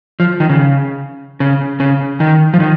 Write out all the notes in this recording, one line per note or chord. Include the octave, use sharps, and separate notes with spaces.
F3
D#3
C#3
C#3
C#3
D#3
F3
D#3